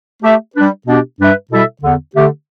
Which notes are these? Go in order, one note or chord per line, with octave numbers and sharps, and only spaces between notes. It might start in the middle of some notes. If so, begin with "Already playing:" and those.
A3 G4 E5
G3 D4 B4
B2 B3 D4 G4
G2 G3 D4 B4 E5
B2 G3 E4 A4 E5
E2 D3 B3
D3 A3 G4